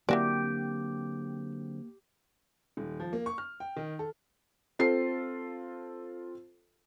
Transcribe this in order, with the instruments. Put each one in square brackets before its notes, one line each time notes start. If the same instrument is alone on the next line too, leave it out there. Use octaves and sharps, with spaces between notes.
[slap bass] D3 F#3 C4 [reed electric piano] A#3 [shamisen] E4 F#4 D5 [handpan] G4
[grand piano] D#1
F3
A#3
C#6
F6
G5
D#3
A4
[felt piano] C4 F4 A4 C7